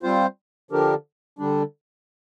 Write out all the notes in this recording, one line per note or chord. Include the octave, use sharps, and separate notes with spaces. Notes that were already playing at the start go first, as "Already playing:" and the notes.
G3 C4 F4 C5
D3 F3 D4 G4 A#4
D3 G3 D4